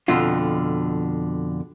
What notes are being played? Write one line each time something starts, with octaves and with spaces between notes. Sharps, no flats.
F2 B2 D3 F4